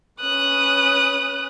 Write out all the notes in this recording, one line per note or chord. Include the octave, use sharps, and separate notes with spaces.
C#4 B4 D#6 F#6